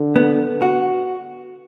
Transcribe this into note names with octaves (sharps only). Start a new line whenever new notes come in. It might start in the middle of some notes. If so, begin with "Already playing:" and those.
Already playing: D3
B3
F#4